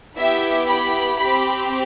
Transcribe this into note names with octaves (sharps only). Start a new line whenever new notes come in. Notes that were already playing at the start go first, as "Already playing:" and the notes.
B3 E4 G4 E5
B5
C4 G4 B5